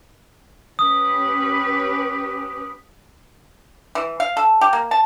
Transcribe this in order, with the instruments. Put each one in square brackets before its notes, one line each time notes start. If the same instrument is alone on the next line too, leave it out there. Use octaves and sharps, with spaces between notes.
[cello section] C#4 G4 B4 [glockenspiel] D#6
[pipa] E3
F5
A4
G4
A#3
A5